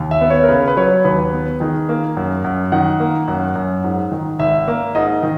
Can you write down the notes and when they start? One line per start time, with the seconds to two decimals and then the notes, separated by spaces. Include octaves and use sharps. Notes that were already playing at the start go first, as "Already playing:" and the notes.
Already playing: D#2
0.11 E5
0.21 B3
0.30 C#5
0.43 A#4
0.49 C#3 B4
0.68 B4
0.77 F#3 C#5
1.04 D#2 B4
1.33 B3
1.60 D#3 G#4
1.89 A#3
2.17 F#2
2.44 F#2
2.72 D#3 F#5
3.00 A#3
3.28 F#2 F#5
3.55 F#2
3.84 G#2
4.12 D#3
4.39 G#1 E5
4.68 A#3
4.95 G#2 D#5
5.23 D#3